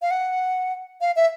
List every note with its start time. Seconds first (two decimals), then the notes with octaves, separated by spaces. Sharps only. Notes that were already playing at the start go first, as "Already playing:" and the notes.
0.02 F5
0.11 F#5
1.01 F5
1.16 E5